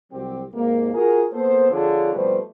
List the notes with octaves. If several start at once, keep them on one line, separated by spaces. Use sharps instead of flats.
C2 F#3 C4 G4
G#1 D#2 G#2 A#3
F4 F#4 G#4 A#4
A#3 B3 A4 C5
F2 D3 D4 F4 G#4 C#5
F2 B2 G3 A3 B4 C5